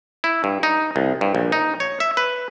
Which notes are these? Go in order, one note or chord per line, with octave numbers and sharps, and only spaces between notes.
E4
G2
D#4
C2
G2
A#1
D#4
C#5
E5
B4